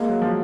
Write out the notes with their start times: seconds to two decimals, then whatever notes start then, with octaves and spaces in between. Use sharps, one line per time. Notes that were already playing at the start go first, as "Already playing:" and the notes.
Already playing: G#3 A#3
0.09 F#3
0.22 F3
0.27 F#3